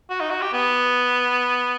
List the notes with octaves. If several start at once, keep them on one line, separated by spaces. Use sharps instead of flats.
F#4
D#4
F#4
G4
B3